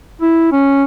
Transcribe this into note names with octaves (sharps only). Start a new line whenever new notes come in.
E4
C#4